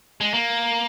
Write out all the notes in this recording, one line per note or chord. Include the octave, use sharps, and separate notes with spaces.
G#3
A#3